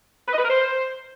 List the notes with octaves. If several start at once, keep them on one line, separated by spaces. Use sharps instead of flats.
B4
D#5
B4
A#4
C5